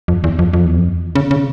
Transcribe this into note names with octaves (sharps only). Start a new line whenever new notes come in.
F2
E2
F2
F2
E2
F2
C#3
C#3